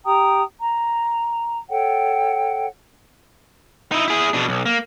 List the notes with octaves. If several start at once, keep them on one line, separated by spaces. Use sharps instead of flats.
G4 G5 A#5 D#6
A#5
A4 C#5 F#5 G5
D#4 E4
E4 G#4
B2 D4
B1
A#3